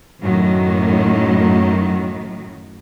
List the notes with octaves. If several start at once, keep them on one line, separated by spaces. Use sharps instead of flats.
F#2 A2 D#3 F#3